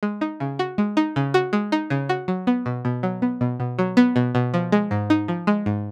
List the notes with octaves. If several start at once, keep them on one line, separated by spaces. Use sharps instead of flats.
G#3
D#4
C#3
F#4
G#3
D#4
C#3
F#4
G#3
D#4
C#3
F#4
F#3
B3
B2
B2
F#3
B3
B2
B2
F#3
B3
B2
B2
F3
G#3
G#2
D#4
F3
G#3
G#2